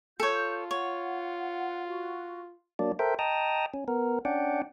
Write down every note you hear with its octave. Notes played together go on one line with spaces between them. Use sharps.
F4 A4 C#5 G6
C#5 F#5
F#4
F#3 A#3 D4 D5
A4 A#4 C5 E5 G5
D#5 G5 A5 A#5 D#6
C#4
B3 A#4
C#4 D4 D5 F#5 G5